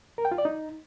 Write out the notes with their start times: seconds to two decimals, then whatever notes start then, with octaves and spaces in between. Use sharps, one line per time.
0.18 A#4
0.25 G5
0.32 F4
0.38 D5
0.45 D#4